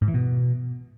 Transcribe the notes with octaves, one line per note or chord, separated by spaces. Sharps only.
G#2
E3
B2